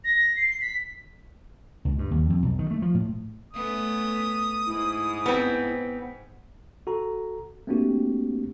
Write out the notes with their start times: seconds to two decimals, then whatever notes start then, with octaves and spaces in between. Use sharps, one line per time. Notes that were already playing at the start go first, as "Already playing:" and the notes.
0.04 A#6
0.36 C7
0.61 B6
1.85 C#2
1.98 G2
2.11 D#2
2.30 F2
2.43 B1
2.59 D#3
2.71 A3
2.82 F3
2.95 A2
3.53 A3 B3 C#4 D#6
4.67 G#2 E4
5.26 B3 C4
6.87 F#4 A4 A#5
7.67 A3 A#3 C4 D4 F#4 G4